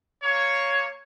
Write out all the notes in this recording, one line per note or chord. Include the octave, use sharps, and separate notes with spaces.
A#3 C#5